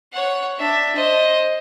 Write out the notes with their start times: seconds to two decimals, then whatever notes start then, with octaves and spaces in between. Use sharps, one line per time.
0.13 C#5 F#5
0.59 D4 E5
0.95 C5 D#5